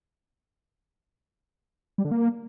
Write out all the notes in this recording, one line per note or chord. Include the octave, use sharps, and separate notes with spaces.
G3
D3
A#3